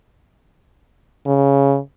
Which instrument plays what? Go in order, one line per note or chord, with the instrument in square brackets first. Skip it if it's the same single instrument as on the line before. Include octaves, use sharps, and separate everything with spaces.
[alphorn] C#3